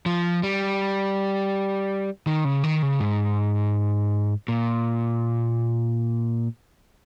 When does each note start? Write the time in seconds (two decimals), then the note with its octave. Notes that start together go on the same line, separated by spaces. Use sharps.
0.06 F3
0.43 G3
2.27 D#3
2.45 C#3
2.64 D#3
2.82 C#3
3.00 G#2
4.48 A#2